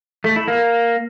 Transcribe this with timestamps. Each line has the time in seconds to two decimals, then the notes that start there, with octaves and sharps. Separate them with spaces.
0.24 A3
0.36 E4
0.48 A#3